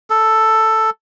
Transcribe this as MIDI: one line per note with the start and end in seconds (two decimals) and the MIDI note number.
0.10 0.90 69